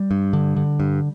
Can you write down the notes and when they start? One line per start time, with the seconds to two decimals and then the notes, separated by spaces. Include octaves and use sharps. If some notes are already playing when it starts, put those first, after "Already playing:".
Already playing: G3
0.11 G2
0.33 D3
0.56 D3
0.80 G2